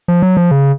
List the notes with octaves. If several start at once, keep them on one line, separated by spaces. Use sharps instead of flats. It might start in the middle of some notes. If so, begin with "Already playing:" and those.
F3
F#3
F3
C#3